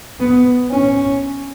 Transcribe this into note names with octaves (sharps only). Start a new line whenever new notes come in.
B3
C#4